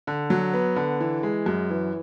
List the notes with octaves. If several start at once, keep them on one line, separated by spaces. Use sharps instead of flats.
D3
F#3
B3
D3
E3
G#3
F#2
E3